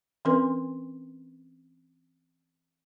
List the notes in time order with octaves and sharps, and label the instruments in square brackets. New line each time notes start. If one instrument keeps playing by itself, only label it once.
[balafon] E3 C4 C#4 A#4 B4 C6